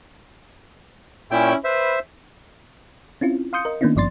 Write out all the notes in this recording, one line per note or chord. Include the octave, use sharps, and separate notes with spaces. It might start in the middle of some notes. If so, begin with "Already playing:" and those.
A#2 C#4 E4 G5
B4 C5 E5
C4 C#4 E4 F4
F5 C6 D#6 G6 C#7
A#4 D#5
D#3 A#3 B3 C#4 D4 E4
G#1 G2 F3 D5 C6 A6